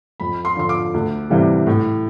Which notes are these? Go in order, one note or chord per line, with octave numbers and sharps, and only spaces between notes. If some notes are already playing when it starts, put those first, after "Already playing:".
F2 B5
C6
D3 F3 C6
D6
D2
C3 E3 G3
A2